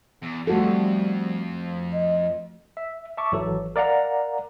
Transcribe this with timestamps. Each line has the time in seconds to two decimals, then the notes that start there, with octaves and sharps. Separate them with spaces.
0.23 E2
0.47 F2 G3 A3 F#4 A4
1.93 D#5
2.77 E5
3.17 E5 A5 C#6 D6
3.32 G#1 E3 F#3 A4
3.76 A#4 D5 F5 F#5 A#5